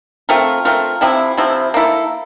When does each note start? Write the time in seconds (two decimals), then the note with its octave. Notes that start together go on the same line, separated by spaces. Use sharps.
0.29 A3 C4 F4 A#4
0.65 A3 C4 F4 A#4
1.01 C3 F3 C4 E4
1.38 C3 F3 C4 E4
1.74 A#3 E4 A4